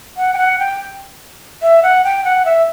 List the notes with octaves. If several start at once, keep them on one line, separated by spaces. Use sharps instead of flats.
F#5
G5
F#5
G5
E5
F#5
G5
F#5
E5